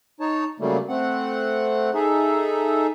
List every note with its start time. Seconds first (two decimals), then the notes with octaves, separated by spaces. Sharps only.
0.21 D#4 C#5 A5
0.60 C#3 F#3 G3 A3 A#3
0.89 A3 C4 F#5
1.94 D#4 G#4 A4 E5